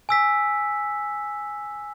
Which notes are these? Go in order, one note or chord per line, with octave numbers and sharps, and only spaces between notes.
G#5 E6 B6